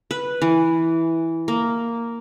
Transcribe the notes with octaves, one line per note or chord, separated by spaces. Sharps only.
B4
E3
A#3